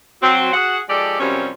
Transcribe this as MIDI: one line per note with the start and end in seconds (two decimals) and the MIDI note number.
0.22 0.52 54
0.22 0.52 60
0.53 0.78 66
0.53 0.78 68
0.53 0.78 78
0.89 1.19 53
0.89 1.19 56
0.89 1.19 67
0.89 1.19 69
0.89 1.19 74
1.20 1.49 42
1.20 1.49 48
1.20 1.49 53
1.20 1.49 55
1.20 1.49 60
1.20 1.49 61